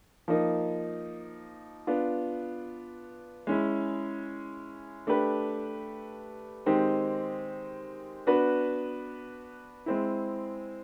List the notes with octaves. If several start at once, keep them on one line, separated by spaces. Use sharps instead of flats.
F3 A#3 D#4
B3 D4 F4
G#3 C#4 E4
A3 D4 G4 B4
D#3 G#3 C4 D#4 G4
B3 D4 F#4 B4
G#3 C4 E4